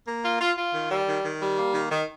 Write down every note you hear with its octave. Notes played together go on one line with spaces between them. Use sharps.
A#3
F4
F4
F4
D#3
G3
D#3
D#3
G3
A#3
D#3
D#3